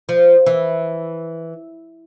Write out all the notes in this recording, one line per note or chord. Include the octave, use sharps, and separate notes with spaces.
F3
E3